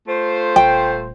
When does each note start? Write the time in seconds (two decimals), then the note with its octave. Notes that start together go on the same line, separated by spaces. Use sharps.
0.07 A3 F4 C5
0.56 D#1 G5